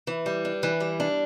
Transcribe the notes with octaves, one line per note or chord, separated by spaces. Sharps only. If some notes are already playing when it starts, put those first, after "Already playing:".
E3
G3
D4
E3
G3
D4